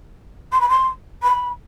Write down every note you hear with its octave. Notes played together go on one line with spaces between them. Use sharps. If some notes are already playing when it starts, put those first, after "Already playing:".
C6
B5
C6
B5